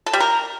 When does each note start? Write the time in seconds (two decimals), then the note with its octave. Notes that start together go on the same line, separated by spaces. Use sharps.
0.06 A4
0.13 G3
0.20 A#4